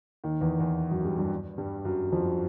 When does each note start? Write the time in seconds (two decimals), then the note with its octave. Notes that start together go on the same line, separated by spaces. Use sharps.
0.24 D#2 D#3
0.41 E2 E3
0.60 E2 E3
0.91 F#2 F#3
1.05 G2 G3
1.18 G2 G3
1.58 G2 G3
1.85 F#2 F#3
2.12 F2 F3